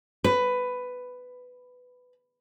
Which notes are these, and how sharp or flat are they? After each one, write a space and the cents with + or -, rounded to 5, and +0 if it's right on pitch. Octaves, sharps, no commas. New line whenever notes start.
B4 +10